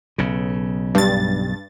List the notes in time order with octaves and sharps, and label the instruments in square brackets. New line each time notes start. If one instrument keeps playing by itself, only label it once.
[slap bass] B1 C#3
[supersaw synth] G2 A6